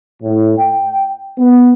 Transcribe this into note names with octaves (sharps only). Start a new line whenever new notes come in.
A2
G5
B3